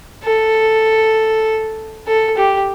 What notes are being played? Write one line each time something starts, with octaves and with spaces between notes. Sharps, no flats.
A4
A4
G4